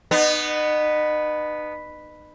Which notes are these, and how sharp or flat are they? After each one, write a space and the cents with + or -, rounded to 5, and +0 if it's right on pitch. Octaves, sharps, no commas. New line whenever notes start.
B3 +0 D#4 -35